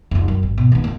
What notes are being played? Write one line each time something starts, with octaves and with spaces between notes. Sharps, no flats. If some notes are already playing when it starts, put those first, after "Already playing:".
F1 C#2
F#2
G#1
B2
D#2 B3
C#2 A#3